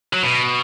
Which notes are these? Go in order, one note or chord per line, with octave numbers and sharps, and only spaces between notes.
F#3
B2